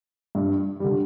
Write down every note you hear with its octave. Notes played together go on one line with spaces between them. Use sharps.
G2
D3 G3